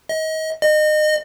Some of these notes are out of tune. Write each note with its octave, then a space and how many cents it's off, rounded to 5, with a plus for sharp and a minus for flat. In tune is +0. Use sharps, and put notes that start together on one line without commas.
D#5 +30
D#5 -30